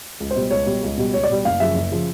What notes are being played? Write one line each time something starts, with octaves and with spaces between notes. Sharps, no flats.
C#2
C5
B2 G3
C#2 C#5
B2 G3
C#2
B2 G3
C#2 C#5
D5
B2 G3
F#1 F5
F#2 C#3 F3 E5
F#1
C#3 F3